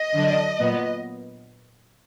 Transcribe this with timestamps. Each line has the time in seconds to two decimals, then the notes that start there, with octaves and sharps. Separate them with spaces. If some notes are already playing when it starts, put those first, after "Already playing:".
Already playing: D#5
0.14 D3 F#3 D4
0.60 A#2 F#3 B3